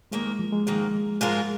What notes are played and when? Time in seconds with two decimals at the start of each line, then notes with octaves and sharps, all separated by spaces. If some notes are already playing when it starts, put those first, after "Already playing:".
0.12 G#2 D#3 G#3 A#3
0.26 G#3
0.39 F3
0.53 G#3
0.67 G#2 D#3 A#3 G#4
1.21 G#2 F3 G#3 F4 A#4